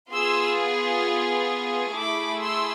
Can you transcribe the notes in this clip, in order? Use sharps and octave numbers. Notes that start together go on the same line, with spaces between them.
B3 F4 G#4 C6 E6
A3 E4 G#4 B5 D6
C6 E6